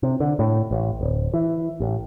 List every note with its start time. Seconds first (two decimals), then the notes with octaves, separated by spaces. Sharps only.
0.03 C3
0.20 D3
0.39 A2
0.71 A1
1.01 D1
1.34 E3
1.80 A1